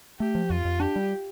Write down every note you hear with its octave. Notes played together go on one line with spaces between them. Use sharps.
A3 G4
F3
F2 F4
F2
D4 G4
G3